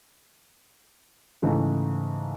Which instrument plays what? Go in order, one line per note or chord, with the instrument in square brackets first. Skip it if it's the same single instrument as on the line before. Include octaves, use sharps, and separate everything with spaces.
[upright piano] G#2 C#3 E3 A3 D#4